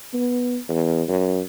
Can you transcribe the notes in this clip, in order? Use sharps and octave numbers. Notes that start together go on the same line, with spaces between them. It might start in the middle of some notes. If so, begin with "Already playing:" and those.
B3
E2
F#2